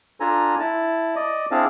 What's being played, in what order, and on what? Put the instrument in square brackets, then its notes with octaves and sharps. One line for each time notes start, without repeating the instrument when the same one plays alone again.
[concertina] D4 F4 A4 G#5 A#5
E4 A5
D5 D#5
C4 D4 E4 G#4 F5 A5